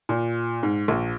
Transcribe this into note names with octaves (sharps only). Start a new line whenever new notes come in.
A#2
G#2
A#1